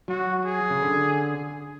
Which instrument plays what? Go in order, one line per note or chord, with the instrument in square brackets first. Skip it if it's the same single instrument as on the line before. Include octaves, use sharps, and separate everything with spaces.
[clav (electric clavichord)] F#3 [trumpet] F#4
[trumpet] G#4
[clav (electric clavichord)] C#3
D3